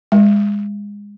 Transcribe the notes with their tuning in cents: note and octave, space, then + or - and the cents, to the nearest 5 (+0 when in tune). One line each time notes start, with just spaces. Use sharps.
G#3 -25